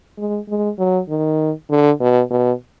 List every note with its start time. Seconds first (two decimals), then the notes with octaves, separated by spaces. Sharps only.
0.18 G#3
0.49 G#3
0.79 F#3
1.09 D#3
1.70 D3
2.00 B2
2.31 B2